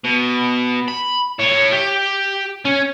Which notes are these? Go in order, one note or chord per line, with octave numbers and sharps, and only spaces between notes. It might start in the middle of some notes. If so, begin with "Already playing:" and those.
B2
B5
E4 C#5
G4
C#4